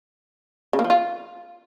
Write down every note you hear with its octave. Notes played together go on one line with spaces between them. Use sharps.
C#3
A#3
F3
F4